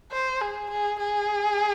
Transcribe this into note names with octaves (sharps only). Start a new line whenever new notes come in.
C5
G#4
G#4
G#4